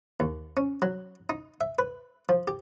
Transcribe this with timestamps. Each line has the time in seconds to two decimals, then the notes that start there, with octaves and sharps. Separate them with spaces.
0.20 D#2
0.57 C#4
0.82 F#3
1.29 D#4
1.61 E5
1.79 B4
2.29 F3
2.48 G4